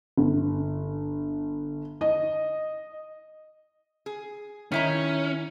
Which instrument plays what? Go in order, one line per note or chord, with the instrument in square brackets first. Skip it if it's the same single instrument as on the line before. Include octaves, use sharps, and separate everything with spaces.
[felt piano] G1
D#5
[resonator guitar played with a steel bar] G#4
[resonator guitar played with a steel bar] D#3 E4 A#5 [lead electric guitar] C#4